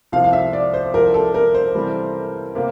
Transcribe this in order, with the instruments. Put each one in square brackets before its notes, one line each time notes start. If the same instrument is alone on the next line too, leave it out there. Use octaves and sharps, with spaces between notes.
[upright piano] C2 C3 F3 [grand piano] F5
[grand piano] F5
E5
D5
C5
[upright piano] C2 C3 F3 C4 [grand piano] A#4
[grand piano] A4
A#4
C5
[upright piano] C3 E3 G3 C4
C3 A#3